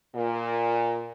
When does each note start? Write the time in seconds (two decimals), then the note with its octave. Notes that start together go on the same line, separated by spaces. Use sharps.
0.15 A#2